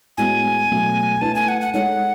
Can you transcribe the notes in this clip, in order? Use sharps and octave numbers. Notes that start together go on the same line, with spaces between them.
A2 G#3 B3 F#4 G#5
B2 F#3 A3
A3 E4 B4 A5
G#5
F#5
F#5
G#3 D#4 A4 C#5 F#5